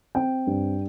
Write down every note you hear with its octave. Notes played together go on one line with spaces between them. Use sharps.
C4 G5
G2